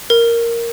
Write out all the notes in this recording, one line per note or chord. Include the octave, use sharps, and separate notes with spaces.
A#4